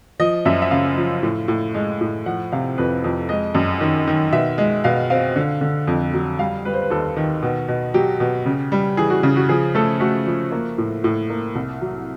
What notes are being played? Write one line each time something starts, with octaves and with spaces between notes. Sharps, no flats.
F3 D#5
F#2 E5
E5
C#3 F5
F3
A2
A2
G#3
A2
F3 F#5
C3 F5
F2 B4
F2
G#3 D#5
F#2
D#3
D#3
B2 E5
G#3
B2 F5
C4 F5
D3
D3
F2
F#3
G3 F5
G3 B4
C5
B4
D#2 A4
D#3
B2
B2
F#3 G4
B2
C#3
G3
E3 G#4
F#4
C#3
F#4
F3 G#4
A3 A4
A3 F#4
F3
A#3
A2
A2
A#3
C2
F#3